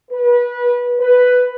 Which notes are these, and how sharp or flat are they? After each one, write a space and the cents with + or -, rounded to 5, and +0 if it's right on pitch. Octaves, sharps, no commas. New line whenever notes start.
B4 -25
B4 +5